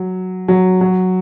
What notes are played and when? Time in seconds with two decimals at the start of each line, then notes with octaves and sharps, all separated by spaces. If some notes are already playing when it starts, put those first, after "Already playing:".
Already playing: F#3
0.48 F#3
0.81 F#3